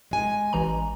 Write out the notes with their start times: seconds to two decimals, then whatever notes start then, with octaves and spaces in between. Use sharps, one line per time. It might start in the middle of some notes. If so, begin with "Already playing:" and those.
0.11 G#3 G#5
0.53 A1 E3 A#5